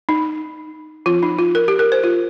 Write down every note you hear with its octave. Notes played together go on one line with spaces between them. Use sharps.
D#4
F3 C4 F4
D#4
F4
A#4
G4
A#4
C5
F4